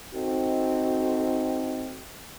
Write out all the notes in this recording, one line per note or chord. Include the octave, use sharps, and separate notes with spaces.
C4 D#4 F#4 A4